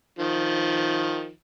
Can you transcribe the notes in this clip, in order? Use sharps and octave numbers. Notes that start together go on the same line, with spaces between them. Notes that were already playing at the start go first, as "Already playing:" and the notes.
D#3 F3